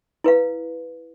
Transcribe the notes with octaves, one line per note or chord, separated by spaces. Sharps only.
E4 B4 F5